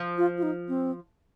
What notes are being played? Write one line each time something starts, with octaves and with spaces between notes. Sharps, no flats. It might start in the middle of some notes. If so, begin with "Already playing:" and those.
Already playing: F3
F4
F4
D#4
C4